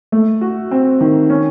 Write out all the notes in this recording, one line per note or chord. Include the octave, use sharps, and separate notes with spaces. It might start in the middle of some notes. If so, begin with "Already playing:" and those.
A3
F#4
C4
D#3
C#4